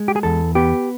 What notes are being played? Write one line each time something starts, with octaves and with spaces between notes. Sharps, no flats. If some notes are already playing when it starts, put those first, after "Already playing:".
Already playing: G#3
G4
G#4
E2 A4
B3 G4